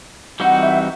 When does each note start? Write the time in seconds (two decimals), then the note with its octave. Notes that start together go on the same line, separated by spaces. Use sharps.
0.40 E3 G3 C4 D#4 F#4 F#5
0.63 E5